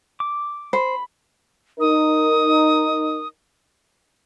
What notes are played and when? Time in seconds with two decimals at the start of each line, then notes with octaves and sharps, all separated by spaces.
0.20 D6
0.73 C5 B5
1.80 D#4 A#4 D#6